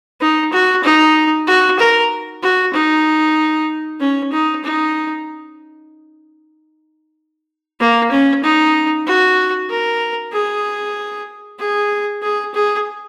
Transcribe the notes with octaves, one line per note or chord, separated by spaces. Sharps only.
D#4
F#4
D#4
F#4
A#4
F#4
D#4
C#4
D#4
D#4
A#3
C#4
D#4
F#4
A#4
G#4
G#4
G#4
G#4